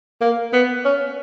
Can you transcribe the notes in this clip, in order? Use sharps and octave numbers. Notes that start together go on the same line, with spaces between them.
A#3
B3
C#4